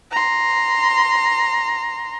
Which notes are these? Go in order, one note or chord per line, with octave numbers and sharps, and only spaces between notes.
A#5 C6